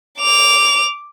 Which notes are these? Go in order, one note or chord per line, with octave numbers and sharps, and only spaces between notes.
D6 F7